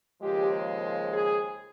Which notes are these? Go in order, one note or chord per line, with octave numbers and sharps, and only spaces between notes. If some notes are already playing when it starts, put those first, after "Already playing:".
D#2 C#3 F3 G#3 G4
G#4